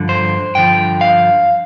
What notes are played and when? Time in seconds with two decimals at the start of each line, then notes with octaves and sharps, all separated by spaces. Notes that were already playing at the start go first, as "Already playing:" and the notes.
Already playing: G2 D3 F3
0.09 C5
0.55 G2 D3 F3 G5
1.01 F5